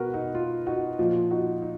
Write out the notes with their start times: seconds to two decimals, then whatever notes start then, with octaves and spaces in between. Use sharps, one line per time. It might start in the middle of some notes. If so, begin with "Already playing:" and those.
Already playing: B2 F#4 A#4 B4
0.13 D#4 F#4
0.35 F4
0.66 D#4 F#4
0.99 A#2 F3
1.30 D#4 F#4
1.62 D#4